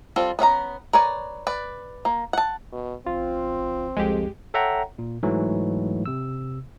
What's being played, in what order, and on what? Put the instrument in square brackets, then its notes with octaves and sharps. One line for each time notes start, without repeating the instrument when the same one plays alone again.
[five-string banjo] G3 C4 F4 A4
B3 C#4 F5 A#5
A#4 B4 C#5 D5 G#5
B4 D5
A#3
F#5 A5
[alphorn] B2
[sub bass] A1 [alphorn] C4 [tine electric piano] F4
[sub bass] C2 [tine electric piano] F2 [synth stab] G#3 G4
[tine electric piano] A4 C#5 E5 F#5 G5 A#5
A#2
G#2 E3 F#3 A3
C3 E6